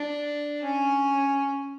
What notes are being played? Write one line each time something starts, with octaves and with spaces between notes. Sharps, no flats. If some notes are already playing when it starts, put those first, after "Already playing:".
Already playing: D4
C#4